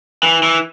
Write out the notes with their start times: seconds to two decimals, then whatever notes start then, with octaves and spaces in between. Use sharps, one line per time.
0.23 E3
0.43 E3